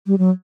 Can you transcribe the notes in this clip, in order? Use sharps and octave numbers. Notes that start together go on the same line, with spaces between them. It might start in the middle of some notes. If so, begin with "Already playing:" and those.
G3
F#3